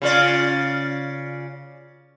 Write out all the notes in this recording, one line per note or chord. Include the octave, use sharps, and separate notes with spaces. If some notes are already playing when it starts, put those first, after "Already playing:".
C#3 F4 D5